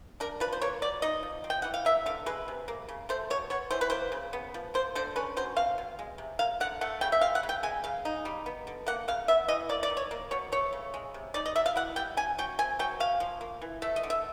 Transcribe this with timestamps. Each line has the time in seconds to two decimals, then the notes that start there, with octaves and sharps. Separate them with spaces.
0.20 D4 A#4
0.40 F3 B4
0.53 C5
0.62 A#3 C#5
0.82 B2 D5
1.02 D#4 D#5
1.23 F3
1.44 C4
1.50 G5
1.62 E3 F#5
1.74 F5
1.85 A#3 E5
2.06 D3 F5
2.26 G#3 B4
2.48 C3
2.68 A#3
2.89 C#3
3.09 A3 C5
3.30 B2 C#5
3.50 B3 C#5
3.71 E3 C5
3.81 B4
3.90 A#3 C5
4.12 C#3
4.33 B3
4.54 F3
4.74 A#3 C5
4.95 D3 C5
5.16 C#4 B4
5.37 F#3 C5
5.56 C4 F5
5.78 B2
5.99 G#3
6.18 C3
6.39 A#3 F5
6.60 D3 F#5
6.81 A3 F#5
7.01 C#3 G5
7.12 E5
7.21 G#3 F5
7.35 F#5
7.43 C#3
7.49 G5
7.63 G#3 G#5
7.84 C#3 F5
8.05 D#4
8.25 G3
8.46 B3
8.67 D3
8.87 A#3 F#5
9.08 C#3 F5
9.28 B3 E5
9.48 E3 D#5
9.69 A#3 D5
9.83 D5
9.90 D#3
9.97 C#5
10.11 A#3
10.31 B2 C#5
10.52 A3 C#5
10.73 C#3
10.94 G#3
11.14 C3
11.34 D#4 D5
11.46 D#5
11.56 F#3 E5
11.66 F5
11.75 E4 F#5
11.96 G3 G5
12.17 C#4 G#5
12.38 F#3 G5
12.59 C4 G#5
12.79 F#3 G5
13.00 C#4 F5
13.20 F3
13.41 A#3
13.62 E3
13.82 A3 E5
13.96 D#5
14.03 D3
14.10 E5